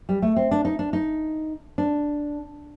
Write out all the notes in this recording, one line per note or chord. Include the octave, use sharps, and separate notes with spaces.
G3
A3
C4
D4
D#4
D4
D#4
D4